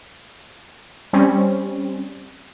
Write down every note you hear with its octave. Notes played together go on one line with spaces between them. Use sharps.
G3 C4 C#4